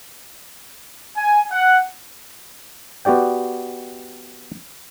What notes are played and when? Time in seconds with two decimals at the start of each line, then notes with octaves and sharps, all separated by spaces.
1.17 G#5
1.52 F#5
3.05 B3 F#4 G4 D5 G5